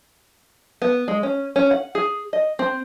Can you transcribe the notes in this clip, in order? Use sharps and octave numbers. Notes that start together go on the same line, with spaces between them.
B3
G#3
C#4
C#4
F#5
G#4
D#5
C4